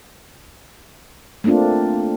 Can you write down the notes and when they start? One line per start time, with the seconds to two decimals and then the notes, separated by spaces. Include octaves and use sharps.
1.44 A3 A#3 C4 D4 F4